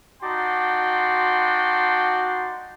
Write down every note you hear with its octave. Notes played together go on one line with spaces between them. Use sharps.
D#4 F#4 D5 G5 A5 C6